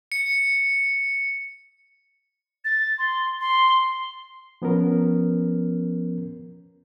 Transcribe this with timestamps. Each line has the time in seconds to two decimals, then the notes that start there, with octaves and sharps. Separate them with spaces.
0.12 C#7
2.65 A6
2.98 C6
3.41 C6
4.62 F3 B3 C#4 A#4